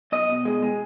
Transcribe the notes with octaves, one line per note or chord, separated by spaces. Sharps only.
B1 D#5
B2
G#3
G#3